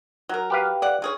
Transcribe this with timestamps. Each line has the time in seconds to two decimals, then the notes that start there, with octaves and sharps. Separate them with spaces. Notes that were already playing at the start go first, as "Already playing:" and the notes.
0.29 F#3 A#4
0.50 G4 B4 F5
0.82 D5 F#5
1.02 C#3 G#4 C#5